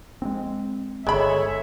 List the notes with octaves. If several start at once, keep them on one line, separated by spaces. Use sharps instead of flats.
G#3 B3 C4
G1 D3 G#3 G#4 A4 C#5 E5 B5